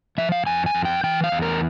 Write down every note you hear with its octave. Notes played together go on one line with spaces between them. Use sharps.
F3 E5
F5
F2 G#5
G#5
F2
G5
E3 G5
F5
E2
A#4